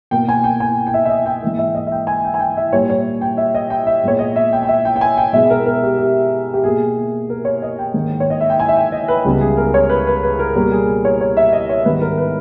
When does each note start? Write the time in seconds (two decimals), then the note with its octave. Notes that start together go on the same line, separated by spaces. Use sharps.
0.11 B2 A#3 G5
0.28 G#5
0.44 G5
0.60 G#5
0.87 G5
0.94 E5
1.05 E5
1.09 D#5
1.26 G5
1.42 G#2 E3 A#3
1.58 E5
1.75 D#5
1.87 E5
1.92 G5
2.07 G#5
2.24 G5
2.34 G#5
2.40 G5
2.57 E5
2.73 A#2 G3 A#3 C#5
2.90 C#5
3.21 G5
3.37 E5
3.55 D#5
3.70 G5
3.87 E5
4.04 A#2 G#3 B3 C#5
4.19 D#5
4.36 E5
4.53 G5
4.63 G5
4.68 E5
4.85 G5
4.96 G5
5.01 G#5
5.17 G5
5.33 B2 G#3 B3 E5
5.50 A#4
5.66 A#4
5.83 G4
5.98 G4
6.54 G4
6.64 B2 A#3 G#4
7.30 A#4
7.45 C#5
7.62 D#5
7.79 G5
7.94 G#2 D#3 A#3
8.20 C#5
8.30 D#5
8.40 E5
8.50 G5
8.59 G#5
8.68 E5
8.76 G5
8.92 D#5
9.08 B4
9.25 C#2 C#3 G3 B3
9.41 G#4
9.57 A#4
9.74 C#5
9.89 B4
10.07 B4
10.23 B4
10.39 A#4
10.56 B2 G3 A#3 A#4
10.72 G#4
11.05 C#5
11.21 C#5
11.37 E5
11.53 D#5
11.69 C#5
11.85 G#2 D#3 G3 B3 B4
12.01 A#4
12.18 B4